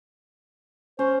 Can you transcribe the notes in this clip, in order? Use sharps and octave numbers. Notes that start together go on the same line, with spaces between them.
C#4 C5 C#5